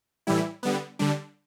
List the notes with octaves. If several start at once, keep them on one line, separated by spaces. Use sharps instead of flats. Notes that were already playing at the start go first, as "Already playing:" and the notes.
A2 E3 G3 E4
D3 G3 B3
D3 G3 D4